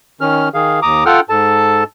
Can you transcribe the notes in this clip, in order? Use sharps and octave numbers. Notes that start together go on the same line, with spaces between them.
D#3 C#4 F6
D#3 G#4 F5
D#2 A#5 D6 D#6
F4 A4 F#5 G5 F6
G#2 A4 A5